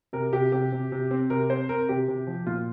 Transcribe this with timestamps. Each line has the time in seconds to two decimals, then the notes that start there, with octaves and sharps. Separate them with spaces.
0.13 C3 A#4
0.33 C3 G4
0.52 C3 G4
0.72 C3
0.92 C3
1.11 C4
1.30 C3 A#4
1.50 C4 C5
1.69 C4 A#4
1.89 C3 G4
2.08 C3
2.27 F3
2.46 A#2 F4